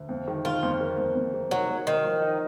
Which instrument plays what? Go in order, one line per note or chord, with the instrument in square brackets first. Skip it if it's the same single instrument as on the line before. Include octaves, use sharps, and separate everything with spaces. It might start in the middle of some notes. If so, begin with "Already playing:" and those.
Already playing: [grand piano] D2
F2
D#3
[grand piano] D#3 [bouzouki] F4
[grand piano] F2
A#3
F2
F2
A#3
[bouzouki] F#3 [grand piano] D#4
[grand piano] A#3
[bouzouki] D#3 [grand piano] A#3
[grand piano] F3
D#4